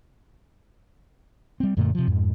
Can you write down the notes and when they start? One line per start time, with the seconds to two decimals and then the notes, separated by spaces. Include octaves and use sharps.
1.60 G3 C4
1.77 F#2 A#2 D3 A3
1.95 C3 F3
2.08 F2 G#2